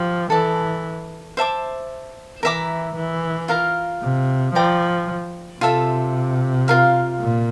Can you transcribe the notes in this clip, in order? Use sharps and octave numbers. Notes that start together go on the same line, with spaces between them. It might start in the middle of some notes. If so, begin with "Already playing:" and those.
Already playing: F3 G4
E3 A4 D5 A5
C5 E5 A5 D6
E3 A#4 E5 A#5 D6
E3
F4 A#4 F5 A#5
C3
F3 D5 G5 A#5 D6
C3 F4 A4 E5
F4 A#4 F5
A#2